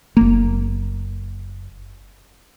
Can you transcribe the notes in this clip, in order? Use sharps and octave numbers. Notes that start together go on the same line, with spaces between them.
F#1 A#3